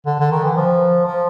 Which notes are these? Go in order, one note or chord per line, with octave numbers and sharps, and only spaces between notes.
D3
D3
D#3
E3
F3
F3